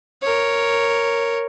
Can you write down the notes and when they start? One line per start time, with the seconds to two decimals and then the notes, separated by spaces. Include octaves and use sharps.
0.22 A#4 C#5